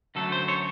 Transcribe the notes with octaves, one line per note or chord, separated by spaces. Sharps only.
F#2 D3 F#3 A3 A4
C5
C#5